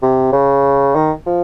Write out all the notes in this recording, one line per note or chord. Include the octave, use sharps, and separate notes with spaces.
C3
C#3
D#3
F3